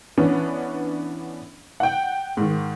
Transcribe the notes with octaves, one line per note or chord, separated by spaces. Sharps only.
E3 B3 C#4 D4
F#5 G5
G#2 D#3